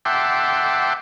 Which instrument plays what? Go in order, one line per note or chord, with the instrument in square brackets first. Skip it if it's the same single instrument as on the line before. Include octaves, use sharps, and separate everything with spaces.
[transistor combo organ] E5 F#5 G5 A5 C6 D6